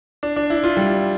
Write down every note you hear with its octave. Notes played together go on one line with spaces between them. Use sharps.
D4
D4
E4
F4
G3